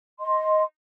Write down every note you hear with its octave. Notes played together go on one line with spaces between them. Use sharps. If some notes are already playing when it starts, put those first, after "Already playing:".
D#5 C6